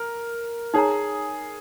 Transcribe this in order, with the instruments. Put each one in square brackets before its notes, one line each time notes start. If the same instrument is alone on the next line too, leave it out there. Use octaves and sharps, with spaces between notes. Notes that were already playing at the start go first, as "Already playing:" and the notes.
Already playing: [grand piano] A#4
[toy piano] D#4 C#5 A#5 [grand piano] G#4